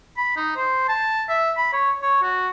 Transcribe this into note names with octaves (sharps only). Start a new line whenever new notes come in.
B5
D#4
C5
A5
E5
B5
C#5
C#5
F#4